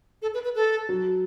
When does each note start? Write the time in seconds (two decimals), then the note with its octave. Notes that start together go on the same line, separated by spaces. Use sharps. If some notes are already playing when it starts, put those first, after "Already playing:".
0.22 A4
0.34 B4
0.44 B4
0.55 A4
0.89 F#3